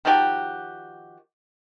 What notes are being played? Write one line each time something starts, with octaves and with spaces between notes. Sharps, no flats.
D#3 F3 F#4 G4